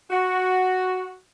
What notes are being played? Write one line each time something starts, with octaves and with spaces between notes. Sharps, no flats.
F#4